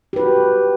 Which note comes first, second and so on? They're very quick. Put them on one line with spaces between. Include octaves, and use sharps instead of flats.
G4 B4 F#4